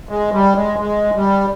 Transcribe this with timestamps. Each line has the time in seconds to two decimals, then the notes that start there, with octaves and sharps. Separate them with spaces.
0.09 G#3
0.32 G3
0.56 G#3
0.79 G#3
1.15 G3